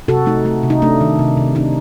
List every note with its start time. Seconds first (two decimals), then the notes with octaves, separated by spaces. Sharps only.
0.08 C3 F#4 A4
0.26 A3 D#4
0.45 A3
0.63 C3
0.70 D#4
0.82 A3 D4
1.01 D#3
1.19 C3
1.37 C3
1.55 D4 D#4